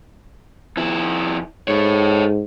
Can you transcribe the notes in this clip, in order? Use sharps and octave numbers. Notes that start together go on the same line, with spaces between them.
F2 E4
G#2 A4 C#5